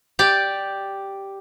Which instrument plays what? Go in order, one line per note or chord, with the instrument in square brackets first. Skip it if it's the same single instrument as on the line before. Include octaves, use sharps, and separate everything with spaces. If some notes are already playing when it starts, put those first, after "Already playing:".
[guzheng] G4 D5